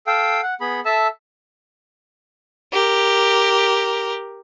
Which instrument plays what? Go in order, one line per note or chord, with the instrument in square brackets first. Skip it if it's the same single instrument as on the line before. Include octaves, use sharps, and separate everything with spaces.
[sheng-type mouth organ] A4 F5 G5
F#5
B3 G#4 B5
A4 E5 A5
[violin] G4 A#4